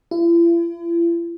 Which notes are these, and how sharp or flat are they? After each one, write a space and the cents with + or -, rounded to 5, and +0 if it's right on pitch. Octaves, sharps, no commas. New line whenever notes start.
E4 +45